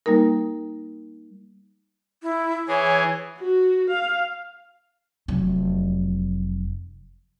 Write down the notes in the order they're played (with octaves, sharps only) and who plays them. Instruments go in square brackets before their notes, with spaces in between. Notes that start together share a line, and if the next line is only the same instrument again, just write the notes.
[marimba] G3 A#3 D#4 A#4
[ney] E4
[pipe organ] E3 G#4 [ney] C#5
[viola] F#4
F5
[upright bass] F1 F#3